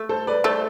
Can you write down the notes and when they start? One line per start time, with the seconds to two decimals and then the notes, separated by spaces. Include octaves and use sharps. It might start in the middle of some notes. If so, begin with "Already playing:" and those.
Already playing: A3
0.09 A4 C5
0.27 B4 D5
0.44 A3 A4 C5